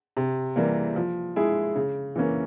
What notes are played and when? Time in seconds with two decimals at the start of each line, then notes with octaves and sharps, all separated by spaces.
0.17 C3
0.56 E3 G3 A#3
0.96 F3
1.36 G#3 E4 G#4
1.75 C#3
2.16 E3 A#3 C#4